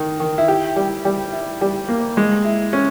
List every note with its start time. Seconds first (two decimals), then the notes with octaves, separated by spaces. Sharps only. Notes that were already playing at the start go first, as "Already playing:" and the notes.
Already playing: D#3 D#4
0.20 D#3
0.38 E4
0.48 E4 G4
0.76 G3
1.05 G3
1.32 E4
1.61 G3
1.88 A#3
2.17 G#3
2.45 E4
2.73 C#4